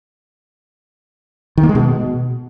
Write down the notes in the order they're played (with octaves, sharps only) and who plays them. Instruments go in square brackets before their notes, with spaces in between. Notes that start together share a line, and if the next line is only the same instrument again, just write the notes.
[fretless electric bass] D#3
A#3
G#3
B2